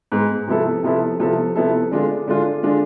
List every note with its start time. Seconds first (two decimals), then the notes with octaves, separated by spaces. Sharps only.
0.12 G#2 G#3 B3
0.47 C3 F3 B3 E4 A4
0.83 C3 F3 B3 E4 A4
1.19 C3 F3 B3 E4 A4
1.56 C3 F3 B3 E4 A4
1.91 D3 G#3 D4 F4
2.28 D3 G#3 D4 F4
2.63 D3 G#3 D4 F4